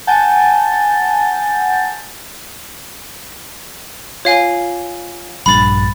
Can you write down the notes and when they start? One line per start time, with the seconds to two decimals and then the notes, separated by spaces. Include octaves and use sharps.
0.07 F#5 G#5 A5 G6 A6
4.25 F4 C#5 F5 G#5
5.46 A#1 G2 B5 A6